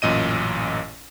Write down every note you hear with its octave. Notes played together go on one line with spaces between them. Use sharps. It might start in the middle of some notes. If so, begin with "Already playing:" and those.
A1 F#2 A#2 D#5 D#7